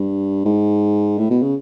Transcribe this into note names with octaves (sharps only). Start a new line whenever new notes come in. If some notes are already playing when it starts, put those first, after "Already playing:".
Already playing: G2
G#2
A2
B2
C#3